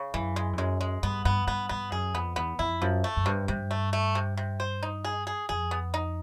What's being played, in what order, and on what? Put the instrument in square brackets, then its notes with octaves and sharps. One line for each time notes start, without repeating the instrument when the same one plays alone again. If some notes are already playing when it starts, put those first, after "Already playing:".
Already playing: [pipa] C#3
[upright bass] F#2 [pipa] E3
[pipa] G#3
[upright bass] F2
[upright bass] F#2 [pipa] G#3
[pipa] G#3
[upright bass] G2 [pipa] B3
[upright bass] G2 [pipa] B3
[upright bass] G2 [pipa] B3
[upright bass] G2 [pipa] B3
[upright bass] F#2 [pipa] G#4
[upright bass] F2 [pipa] B3
[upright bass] E2 [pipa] B3
[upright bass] F2 [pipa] E4
[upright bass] F#2 [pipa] F3
[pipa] A3
[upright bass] F#2
[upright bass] G2 [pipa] C3
[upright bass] G2 [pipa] C3
[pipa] A3
A3
C3
C3
C5
D#4
G#4
G#4
[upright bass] F2 [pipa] G#4
[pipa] B3
D#4